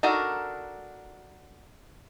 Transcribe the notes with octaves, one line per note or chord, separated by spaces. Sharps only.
D4 D#4 F#4 A4 A#4